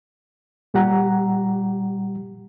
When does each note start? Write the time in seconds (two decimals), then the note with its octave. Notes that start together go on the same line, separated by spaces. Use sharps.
0.74 A#2 G3 G4 F#5 A#5